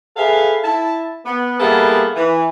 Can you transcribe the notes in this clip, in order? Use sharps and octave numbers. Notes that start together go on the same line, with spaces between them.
G#4 A4 B4 E5 F5
E4 A5
B3
G3 A#3 B3 E4 G#4 A4
E3